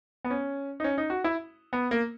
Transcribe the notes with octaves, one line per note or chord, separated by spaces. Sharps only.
B3
C#4
D#4
C#4
D#4
F#4
E4
B3
A#3